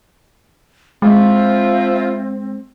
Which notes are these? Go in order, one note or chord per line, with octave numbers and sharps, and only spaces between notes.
F3 G#3 C4 E4 F4